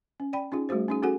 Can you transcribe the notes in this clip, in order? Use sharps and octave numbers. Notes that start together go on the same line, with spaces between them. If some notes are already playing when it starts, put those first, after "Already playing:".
C#4
D5 G5 B5
C#4 D#4 F4 G#4
G3 A3 F#4 G#4 C5
C#4 D#4 G#4
C#4 F#4 G#4 A4 F#5 G#5